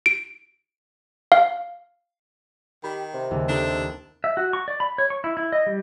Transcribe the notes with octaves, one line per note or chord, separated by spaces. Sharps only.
D7
F5
D#3 G4 B5
C3
D#2 C#3
C4 D4 D#4 A4
E5
F#4
C#6
D5
B5
C#5
C#6
E4
E4
D#5
G3